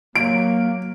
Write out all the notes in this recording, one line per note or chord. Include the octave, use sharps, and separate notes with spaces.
F#3 A#3 D7